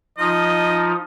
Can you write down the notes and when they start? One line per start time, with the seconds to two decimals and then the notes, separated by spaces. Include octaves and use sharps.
0.18 F3 D#4 F4 D#5